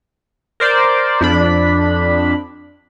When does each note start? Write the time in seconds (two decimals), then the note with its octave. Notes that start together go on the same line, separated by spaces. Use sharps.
0.60 A#4 C5 D5
1.21 F2 D4 B5